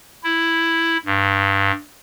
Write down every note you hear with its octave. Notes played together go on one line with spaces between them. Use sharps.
E4
G2